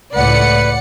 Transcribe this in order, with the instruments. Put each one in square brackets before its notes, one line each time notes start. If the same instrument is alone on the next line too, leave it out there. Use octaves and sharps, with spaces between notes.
[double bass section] C#2 A2 A3 [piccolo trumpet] B4 [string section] D5 F#5 C#7